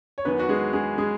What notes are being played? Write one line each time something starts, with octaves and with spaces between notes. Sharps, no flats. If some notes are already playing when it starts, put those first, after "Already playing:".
C#5
E2 D#3 F#3 B3 B4
F#4
G#3 G#4
G#3 G#4
G#3 G#4